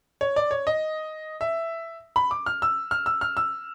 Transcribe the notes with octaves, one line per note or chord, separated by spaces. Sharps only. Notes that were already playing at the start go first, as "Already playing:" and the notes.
C#5
D5
C#5
D#5
E5
B5
D6
F6
E6
F6
E6
F6
E6